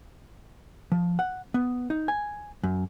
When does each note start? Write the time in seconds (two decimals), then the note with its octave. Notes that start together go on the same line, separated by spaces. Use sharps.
0.92 F3
1.19 F#5
1.54 B3
1.90 D#4
2.08 G#5
2.63 F#2